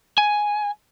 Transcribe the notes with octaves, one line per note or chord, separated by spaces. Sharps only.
G#5